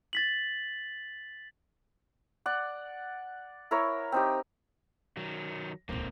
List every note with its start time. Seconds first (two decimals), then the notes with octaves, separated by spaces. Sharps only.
0.13 A6 B6 F#7
2.46 D5 F#5
3.71 E4 A#4 C#5
4.12 C4 D#4 G4
5.17 D#3 F#3
5.89 D#1 C#2 A#3 C4